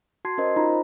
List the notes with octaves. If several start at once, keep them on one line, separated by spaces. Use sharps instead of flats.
F#4 A5 C6 G#6 C7
C#4 A#4 C5 D#5
D#4 F4 A#5 B5
C5